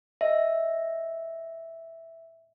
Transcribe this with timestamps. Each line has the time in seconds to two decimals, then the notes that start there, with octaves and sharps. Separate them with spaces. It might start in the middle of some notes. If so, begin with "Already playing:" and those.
0.21 D#5 E5